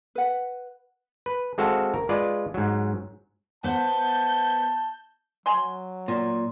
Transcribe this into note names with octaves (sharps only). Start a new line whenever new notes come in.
B4 F#5
B4
G#3 C4 F#4 A4 C5 F5
A#4
G#3 F4 B4 D5
G#2 F#3
B3 C5 F#5 A5 G6
F#3 G#5 C6
A#2